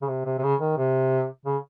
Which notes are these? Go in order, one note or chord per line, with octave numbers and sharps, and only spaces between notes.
C#3
C3
C3
C3
C#3
D#3
C3
C#3